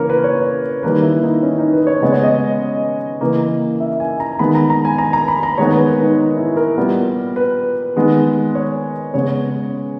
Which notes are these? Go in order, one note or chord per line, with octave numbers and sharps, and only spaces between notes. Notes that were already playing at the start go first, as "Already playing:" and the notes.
Already playing: C#3 E3 A#3 A#4 C#5
B4
C#5
D#3 G3 A#3 B4
E4
D#4
C#4
D#4
B4
C#5
C#3 G#3 B3 D#5
C#5
D#5
C#3 E3 A#3
E5
G#5
A#5
D#3 G#3 B3 B5
A#5
A#5
G#5
A#5
A#5
B5
A#5
D#3 G#3 B3 C#5
B4
A#4
D#4
E4
A#4
A#2 G3 B3
B4
D#3 G#3 B3
C#5
C#3 G#3 B3 C#5